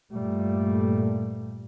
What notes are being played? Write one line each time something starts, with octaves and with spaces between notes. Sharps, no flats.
G2 A#2 G3 A3